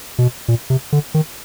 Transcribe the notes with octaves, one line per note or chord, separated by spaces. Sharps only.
B2
A#2
C3
D3
D#3